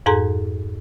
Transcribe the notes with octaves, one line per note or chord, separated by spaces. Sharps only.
F2 G#2 G#4 A4 A#5 C6